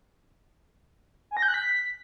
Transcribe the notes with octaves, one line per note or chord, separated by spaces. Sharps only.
G#5
A#6
G6
F#6
B6